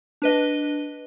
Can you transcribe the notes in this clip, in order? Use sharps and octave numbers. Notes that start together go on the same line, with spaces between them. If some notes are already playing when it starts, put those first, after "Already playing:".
D4 B4 D#5